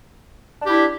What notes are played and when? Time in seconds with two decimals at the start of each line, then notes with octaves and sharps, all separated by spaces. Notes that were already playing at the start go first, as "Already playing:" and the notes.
0.60 D4
0.65 G4
0.70 E4